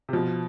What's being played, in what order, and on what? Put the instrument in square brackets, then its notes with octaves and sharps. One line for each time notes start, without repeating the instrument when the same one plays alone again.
[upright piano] C3
[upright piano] B2 [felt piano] F3